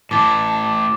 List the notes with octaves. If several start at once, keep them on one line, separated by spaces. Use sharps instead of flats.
A2 E3 A5 D6 A6